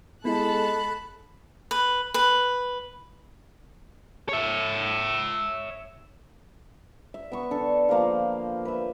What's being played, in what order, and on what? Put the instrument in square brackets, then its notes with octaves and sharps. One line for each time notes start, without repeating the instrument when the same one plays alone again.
[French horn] G#3 [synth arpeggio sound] B3 E4 [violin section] A4 F#6 [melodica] B5
[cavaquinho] B4
B4
[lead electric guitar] C#5 E5
[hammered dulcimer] E5
B3 C#6
D3 A4 C#6
F3 A#3 C5 F5
B4 E5